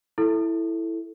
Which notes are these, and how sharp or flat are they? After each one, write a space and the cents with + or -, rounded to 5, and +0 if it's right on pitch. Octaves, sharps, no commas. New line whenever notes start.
E4 +0 A4 +0